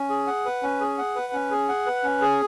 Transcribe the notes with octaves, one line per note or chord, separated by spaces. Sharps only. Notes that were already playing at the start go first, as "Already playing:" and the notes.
Already playing: C#4
G#4
F#5
B4
C#4
G#4
F#5
B4
C#4
G#4
F#5
B4
C#4
G#4